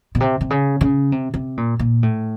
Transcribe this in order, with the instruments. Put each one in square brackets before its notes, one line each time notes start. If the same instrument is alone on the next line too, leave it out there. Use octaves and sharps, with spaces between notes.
[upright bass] B2
C3
C3
C#3
C#3
C3
C3
A#2
A#2
A2